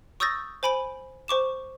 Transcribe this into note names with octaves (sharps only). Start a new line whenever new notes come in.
C#6 D#6 E6 G6 A6 A#6
C5 G#5 B5 D7 F#7
C5 C#6 D6 E7